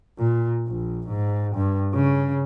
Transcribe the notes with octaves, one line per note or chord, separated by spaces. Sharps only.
A#2
A#1
G#2
G2
C#3